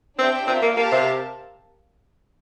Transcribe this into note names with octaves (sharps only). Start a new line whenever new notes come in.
C4 D4 G4 C5 E5 G5
C4 F4 A#4 E5
A#3
A#3 G4 A#4 F5 A5
C3